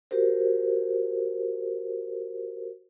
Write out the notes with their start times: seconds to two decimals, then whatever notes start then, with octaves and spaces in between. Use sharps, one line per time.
0.11 F#4 G4 A#4 C5